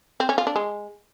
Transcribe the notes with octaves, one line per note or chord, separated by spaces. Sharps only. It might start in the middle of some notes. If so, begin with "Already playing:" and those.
C4
C#4
F4
D4
G#3